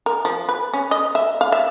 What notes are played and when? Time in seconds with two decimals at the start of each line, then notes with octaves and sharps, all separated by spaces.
0.06 A#4
0.25 F3
0.49 B4
0.74 C#4
0.91 D#5
1.15 E5
1.41 F5
1.52 E5